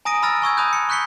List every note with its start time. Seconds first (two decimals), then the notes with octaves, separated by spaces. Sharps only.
0.05 G#5 A#5 D#6 A#6 D7 D#7
0.22 A#5 B5 E6 F6 A6 A#6
0.42 G#5 C#6 E6 G#6
0.57 A5 B5 D#6 E6 F#6 G6
0.73 C#7
0.89 C#6 F#6 G6 B6 C#7 G7